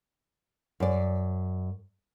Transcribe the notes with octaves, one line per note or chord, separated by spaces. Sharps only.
F#2 D5